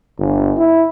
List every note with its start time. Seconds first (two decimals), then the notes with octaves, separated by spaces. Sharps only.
0.19 G1
0.57 E4